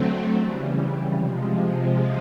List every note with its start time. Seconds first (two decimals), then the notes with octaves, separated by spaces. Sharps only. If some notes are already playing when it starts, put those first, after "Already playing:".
Already playing: D3 F#3 A3 C4
0.35 C#3 E3 G3
1.16 C3 F3 G#3